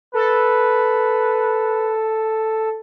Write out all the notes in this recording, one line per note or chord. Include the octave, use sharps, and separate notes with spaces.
A4 B4